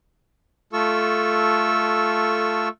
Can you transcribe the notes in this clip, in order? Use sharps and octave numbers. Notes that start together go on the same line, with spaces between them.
A3 F4 A4 C#6 E6